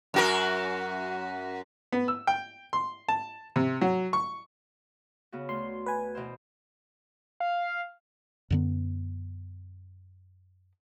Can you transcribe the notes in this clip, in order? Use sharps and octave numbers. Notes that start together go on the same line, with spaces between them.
F#2 F#4 A#4
B3
E6
G5
C6
A5
C3
F#3
C#6
C#3 B3 F#4
D2 C6
B4 G#5
B2 E3 C5
F5
F#2 D3 B3